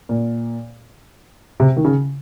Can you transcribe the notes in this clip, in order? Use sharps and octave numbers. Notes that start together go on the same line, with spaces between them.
A#2
C3
D#3
C#3